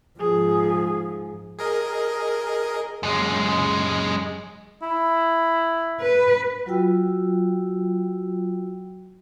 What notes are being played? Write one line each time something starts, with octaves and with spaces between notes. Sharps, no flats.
G#2 F3 G#4
G#4 A#4 D#5
F#2 G#3
E4
B4
F#3 F4 F#4 G5 E6